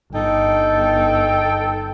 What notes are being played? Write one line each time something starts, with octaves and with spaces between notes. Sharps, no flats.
G1 D#4 A4 G5